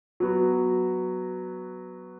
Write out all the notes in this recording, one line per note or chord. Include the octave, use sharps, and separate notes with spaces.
F#3 B3 F#4